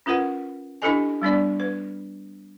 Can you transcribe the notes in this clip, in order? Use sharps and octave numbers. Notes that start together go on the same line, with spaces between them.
C#4 F4 A#4 B4 F#5
D4 E4 G4 A4 D#5 G#5
G3 B3 D4 D5
B4